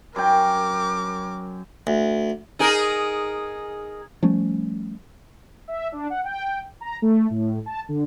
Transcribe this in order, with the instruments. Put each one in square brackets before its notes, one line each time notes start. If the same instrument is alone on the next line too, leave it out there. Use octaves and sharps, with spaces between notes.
[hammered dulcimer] F#2 G5 [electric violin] A#4 D6
[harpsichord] D2
[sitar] D#4 G#4 A#4
[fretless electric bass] F3 G3 A3 C#4
[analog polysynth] E5
D4
F#5
G5
A#5
A3
A2
A5
D3